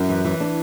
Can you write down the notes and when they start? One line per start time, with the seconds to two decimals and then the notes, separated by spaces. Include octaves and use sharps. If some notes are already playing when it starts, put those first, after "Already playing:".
Already playing: F#2 E4
0.09 E3
0.25 E3
0.40 D4